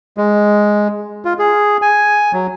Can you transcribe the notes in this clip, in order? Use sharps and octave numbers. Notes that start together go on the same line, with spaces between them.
G#3
F4
G#4
G#5
F#3